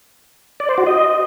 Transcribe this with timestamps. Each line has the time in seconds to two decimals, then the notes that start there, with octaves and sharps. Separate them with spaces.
0.60 D5
0.69 C5
0.78 F#4
0.86 D#5